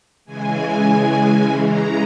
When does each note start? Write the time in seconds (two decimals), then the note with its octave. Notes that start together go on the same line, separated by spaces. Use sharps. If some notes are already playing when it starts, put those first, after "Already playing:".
0.25 C#3 E3 G#3 G#5
1.64 A#5